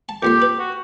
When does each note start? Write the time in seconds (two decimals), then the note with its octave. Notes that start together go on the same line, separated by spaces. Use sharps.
0.09 A5
0.23 F2 A#2 G4 C6
0.42 B4
0.59 F#4